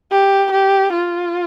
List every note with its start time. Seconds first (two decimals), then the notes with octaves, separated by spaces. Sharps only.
0.12 G4
0.51 G4
0.93 F4